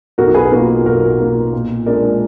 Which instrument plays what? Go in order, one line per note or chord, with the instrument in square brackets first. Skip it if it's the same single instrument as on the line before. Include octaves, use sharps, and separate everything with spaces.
[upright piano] B1 [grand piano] F#4 A#4
[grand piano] G#4 B4
[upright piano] B2 A#3 F4 [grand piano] F#4 A#4
[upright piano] B1 [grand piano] F#4 A#4
[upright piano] B2 A#3 F4
A#2
[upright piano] G#3 D4 [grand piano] A#4 D5